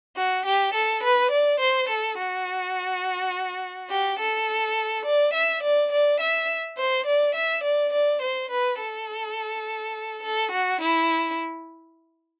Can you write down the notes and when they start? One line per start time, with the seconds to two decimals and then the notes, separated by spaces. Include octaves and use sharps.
0.16 F#4
0.46 G4
0.74 A4
1.03 B4
1.31 D5
1.60 C5
1.89 A4
2.18 F#4
3.90 G4
4.19 A4
5.06 D5
5.34 E5
5.63 D5
5.92 D5
6.20 E5
6.78 C5
7.06 D5
7.35 E5
7.64 D5
7.93 D5
8.22 C5
8.50 B4
8.79 A4
10.23 A4
10.52 F#4
10.81 E4